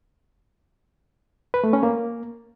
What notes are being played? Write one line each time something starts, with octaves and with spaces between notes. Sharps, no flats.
B4
A3
C#4
A#3